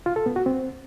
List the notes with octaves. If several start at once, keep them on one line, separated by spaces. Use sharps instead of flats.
F4
A4
B3
F#4
C4